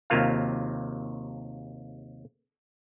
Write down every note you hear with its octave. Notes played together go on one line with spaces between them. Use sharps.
D#2 C3 F#3 A#3 F4 F5